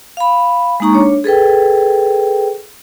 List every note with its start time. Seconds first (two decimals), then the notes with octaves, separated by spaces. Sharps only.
0.17 F5 B5
0.80 G#3 A#3 D#4 A#5 C#6
0.93 D4 C#5
1.24 G#4 A4 B4 G5